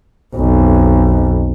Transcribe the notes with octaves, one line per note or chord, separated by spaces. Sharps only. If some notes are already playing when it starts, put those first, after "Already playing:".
B1 F2